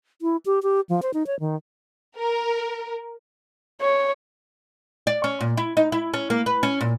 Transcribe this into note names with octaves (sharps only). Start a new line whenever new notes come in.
E4
G4
G4
F3
C5
D#4
C#5
D#3
A#4
C#5
D5
C#4
A#2
E4
D#4
E4
C#4
A#3
B4
C#4
A#2